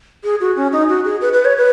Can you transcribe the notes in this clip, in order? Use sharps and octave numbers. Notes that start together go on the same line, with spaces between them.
G#4
F#4
C#4
D#4
F#4
G#4
B4
B4
C#5
B4